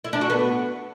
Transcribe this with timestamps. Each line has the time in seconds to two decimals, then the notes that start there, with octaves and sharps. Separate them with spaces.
0.04 E4
0.13 D4
0.21 F#4
0.30 B3